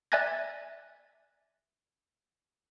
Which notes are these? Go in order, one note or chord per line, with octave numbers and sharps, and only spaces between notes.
D5 E5 G#5 F#6 G#6 A#6